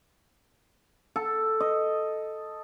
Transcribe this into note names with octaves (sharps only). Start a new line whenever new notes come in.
A4
D#5